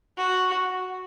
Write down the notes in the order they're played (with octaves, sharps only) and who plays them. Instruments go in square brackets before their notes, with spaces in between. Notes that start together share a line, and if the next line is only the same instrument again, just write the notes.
[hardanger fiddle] F#4